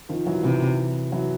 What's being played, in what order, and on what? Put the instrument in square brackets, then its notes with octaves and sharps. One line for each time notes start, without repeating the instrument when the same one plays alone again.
[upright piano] D#3 F3
E3 F#3
[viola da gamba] C3 [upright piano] E3 F#3
[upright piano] E3 F#3